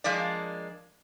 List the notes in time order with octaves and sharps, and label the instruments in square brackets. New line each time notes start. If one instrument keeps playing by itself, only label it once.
[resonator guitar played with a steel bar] F3 G#3 A#3 D4 D5